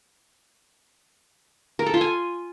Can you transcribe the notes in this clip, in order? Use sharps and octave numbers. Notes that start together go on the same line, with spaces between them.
A#4
A4
F4
G#5